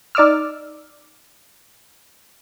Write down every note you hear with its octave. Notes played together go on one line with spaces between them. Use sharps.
D#4 D5 D6 E6 F6